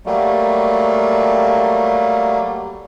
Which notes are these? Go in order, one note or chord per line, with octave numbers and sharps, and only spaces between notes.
F#3 G3 A3 A#3